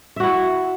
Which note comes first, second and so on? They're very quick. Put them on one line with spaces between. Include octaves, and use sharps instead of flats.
E5 F#4 E4